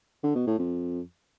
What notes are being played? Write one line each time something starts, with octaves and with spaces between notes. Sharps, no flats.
D3
B2
A2
F2